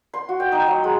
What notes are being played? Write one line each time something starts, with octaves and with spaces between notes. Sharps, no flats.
C6
F#4
G5
D#4
F#3
G#3